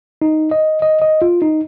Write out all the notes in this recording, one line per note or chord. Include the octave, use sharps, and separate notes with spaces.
D#4
D#5
D#5
D#5
F4
D#4